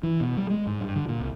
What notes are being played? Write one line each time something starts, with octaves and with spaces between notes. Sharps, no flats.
E3
B2
G3
G#3
G#2
G2
D3
A#2
C2